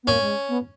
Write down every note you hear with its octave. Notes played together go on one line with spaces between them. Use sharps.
B3
A#3 C#4
G#3
B3